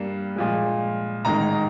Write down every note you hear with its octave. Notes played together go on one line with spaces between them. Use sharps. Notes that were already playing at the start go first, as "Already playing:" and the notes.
Already playing: G2 G3 A#3
A#2 F3 G#3
A1 G#2 D#3 A#5